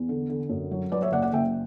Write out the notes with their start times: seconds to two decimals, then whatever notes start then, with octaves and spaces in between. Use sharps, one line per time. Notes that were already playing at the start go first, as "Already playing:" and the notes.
Already playing: E2
0.09 D3
0.29 D3
0.49 F#2
0.71 F#3
0.92 F#3 B4 D5
1.02 C#5 E5
1.12 F#1 D5 F#5
1.22 D5 F#5
1.33 F#1 E5 G5